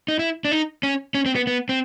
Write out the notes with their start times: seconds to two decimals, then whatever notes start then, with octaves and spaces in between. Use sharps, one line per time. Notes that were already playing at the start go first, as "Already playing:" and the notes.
0.08 D#4
0.19 E4
0.45 D4
0.52 D#4
0.83 C#4
1.15 C#4
1.26 C4
1.36 B3
1.47 B3
1.69 C4